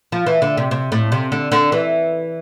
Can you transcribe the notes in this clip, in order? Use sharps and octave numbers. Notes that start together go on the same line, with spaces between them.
F3
E3
D3
C3
C3
A2
C3
D3
D3
E3